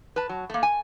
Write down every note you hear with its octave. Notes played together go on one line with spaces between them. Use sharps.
B4 A5
F#3
A3 A#3
G#5